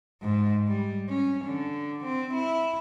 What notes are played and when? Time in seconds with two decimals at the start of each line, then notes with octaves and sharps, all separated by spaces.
0.22 G#2
0.67 G3
1.09 C#4
1.46 D3
2.04 C4
2.34 E4